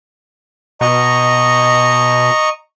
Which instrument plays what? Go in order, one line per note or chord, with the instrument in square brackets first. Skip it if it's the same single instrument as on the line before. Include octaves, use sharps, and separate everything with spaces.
[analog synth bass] B2 [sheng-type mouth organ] D#5 A#5 C#6